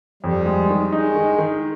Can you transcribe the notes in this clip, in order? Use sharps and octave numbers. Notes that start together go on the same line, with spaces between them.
F2 G3
G#3
D#3
G#3 D#4
D#3
D#3